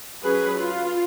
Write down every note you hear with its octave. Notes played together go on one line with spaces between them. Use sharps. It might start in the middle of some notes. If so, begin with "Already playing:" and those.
F#3 C#4 G#4 B4
F4